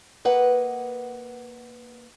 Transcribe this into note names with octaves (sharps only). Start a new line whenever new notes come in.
A#3 B4 D#5 F#5